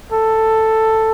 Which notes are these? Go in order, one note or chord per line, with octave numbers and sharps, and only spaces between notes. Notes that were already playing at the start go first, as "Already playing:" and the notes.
A4